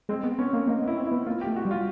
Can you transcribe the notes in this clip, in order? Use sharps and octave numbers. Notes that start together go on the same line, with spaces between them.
G#3 C4
B3
B3 C#4
A#3
A#3 D#4
B3
E4
C4
B3 E4
A#3 F4
G4
A3
F#4
G3
F4